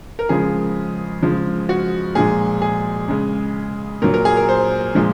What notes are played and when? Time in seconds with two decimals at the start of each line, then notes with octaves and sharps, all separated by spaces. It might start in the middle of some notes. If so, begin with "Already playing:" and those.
0.19 A#4
0.29 C#3 F3 G#3 G#4
1.22 C#3 F3 G#3
1.69 F#4
2.15 A#2 F3 G#3 G#4
2.62 G#4
3.08 C#3 G#3
4.02 A#2 F#3 A#4
4.14 A#4
4.25 G#4
4.37 A#4
4.49 C5
4.95 A#2 F3 G#3